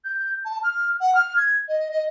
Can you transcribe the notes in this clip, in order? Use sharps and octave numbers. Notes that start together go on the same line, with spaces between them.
G6
A5
F6
F#5
F6
G#6
D#5
D#5